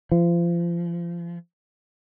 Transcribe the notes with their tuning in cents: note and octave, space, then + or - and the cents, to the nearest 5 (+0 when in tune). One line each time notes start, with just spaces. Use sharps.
F3 -30